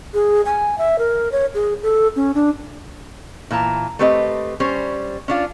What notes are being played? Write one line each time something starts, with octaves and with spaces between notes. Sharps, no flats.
G#4
G#5
E5
A#4
C#5
G#4
A4
C#4
D4
A#2 E3 A5 A#5
A3 C4 G4 B4 D5 D#5
G3 C#4 C5
C#4 D4 F4